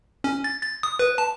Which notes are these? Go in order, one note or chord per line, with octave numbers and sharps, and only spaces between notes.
C#4
A6
A6
D#6
B4
A5